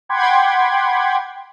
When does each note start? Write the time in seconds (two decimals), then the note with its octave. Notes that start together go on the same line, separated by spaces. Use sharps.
0.09 F#5 G5 B5 C6 D6 G#6